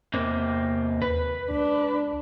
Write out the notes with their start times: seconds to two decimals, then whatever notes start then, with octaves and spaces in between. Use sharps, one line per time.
0.13 E2 C3 A#3 C4
1.02 D#2 B4
1.51 C#2 D4